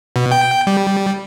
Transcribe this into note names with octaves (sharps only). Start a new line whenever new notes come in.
B2
G5
G3